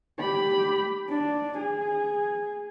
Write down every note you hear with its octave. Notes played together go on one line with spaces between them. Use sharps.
G4 B5
D4
G#4